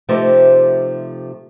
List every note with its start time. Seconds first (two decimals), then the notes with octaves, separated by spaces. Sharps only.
0.09 C3 F3 A3 D#4 G4 C5